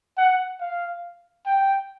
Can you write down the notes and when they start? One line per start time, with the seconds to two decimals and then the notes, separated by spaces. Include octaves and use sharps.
0.18 F#5
0.61 F5
1.46 G5